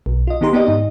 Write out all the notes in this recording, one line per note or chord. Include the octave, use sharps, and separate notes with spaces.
B1
F4 D#5
D#3 B3 D#4 G4 A#5 C6
B3 D#4 G4 D5 D#5
G#2 D#4 D#5